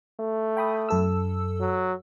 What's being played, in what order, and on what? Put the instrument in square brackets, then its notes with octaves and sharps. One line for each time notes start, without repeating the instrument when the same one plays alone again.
[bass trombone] A3
[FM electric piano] G5 B5 D#6
F#2 A4 E6
[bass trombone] F#3